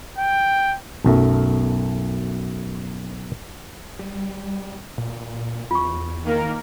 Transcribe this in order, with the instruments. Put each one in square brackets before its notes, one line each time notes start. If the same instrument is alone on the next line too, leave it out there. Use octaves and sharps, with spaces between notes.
[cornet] G5
[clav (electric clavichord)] B1 F#2 A3
[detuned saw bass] G3
A#2
[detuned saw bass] E2 [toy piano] F4 C#6
[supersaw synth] D#3 A#3 A#4